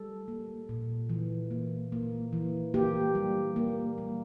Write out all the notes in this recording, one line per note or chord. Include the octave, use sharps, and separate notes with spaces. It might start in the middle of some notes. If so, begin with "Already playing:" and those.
Already playing: G3 A4
A#3
A#2
E3
A#3
A#3
E3
A#3 G4
G3
A#3
G3